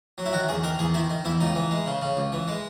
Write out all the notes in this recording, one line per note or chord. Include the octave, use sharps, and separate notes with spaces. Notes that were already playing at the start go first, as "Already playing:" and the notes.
F#3
E4
D#3 F#4
E2 G#4
D#3 A#4
E2 G#4
D#3 E4
D#3
E2 E4
C#2 D#4
E3
G#3
C#3
C#3
C#2
E3
G#3